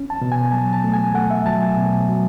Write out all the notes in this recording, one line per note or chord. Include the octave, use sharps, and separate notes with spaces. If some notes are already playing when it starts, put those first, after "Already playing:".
Already playing: C#4
A5
B2
G#5
F#3 A5
A5
A3
G#5
A3 F#5
E5
F#3 A5
G#5
B2
F#3